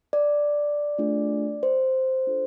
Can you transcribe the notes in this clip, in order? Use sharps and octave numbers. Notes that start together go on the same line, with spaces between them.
D5
A3 D4 F4 G#4
C5
D4 F4 A4